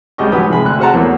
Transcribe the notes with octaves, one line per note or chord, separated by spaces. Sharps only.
C#2 G3 G4 G#4 D#5 C#6
G#2 F3 F#3 G4 B4 D#6
C3 F3 G#3 G#4 B5
D2 C3 F#6
F#4 G#4 C5 F#5 A5 A#5
E2 E3 F#3 A3 A#3